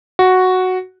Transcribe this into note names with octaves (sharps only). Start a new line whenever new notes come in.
F#4